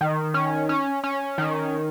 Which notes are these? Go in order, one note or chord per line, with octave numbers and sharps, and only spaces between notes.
D#3
C#4
C#4
C#4
D#3